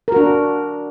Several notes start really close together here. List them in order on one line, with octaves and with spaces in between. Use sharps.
A#4 F#4 D4